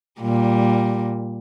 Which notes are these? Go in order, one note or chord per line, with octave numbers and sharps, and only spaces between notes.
A#2 G3